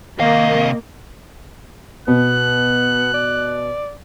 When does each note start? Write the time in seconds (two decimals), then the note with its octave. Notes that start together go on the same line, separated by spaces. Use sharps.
0.20 C3 D#3 A#3 D#5 F5
2.08 B2 B3 F#6
3.14 D5